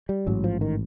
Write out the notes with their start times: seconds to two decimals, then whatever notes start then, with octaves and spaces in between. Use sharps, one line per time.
0.09 G3
0.27 A1 G#2 F#3
0.44 F3
0.61 D#3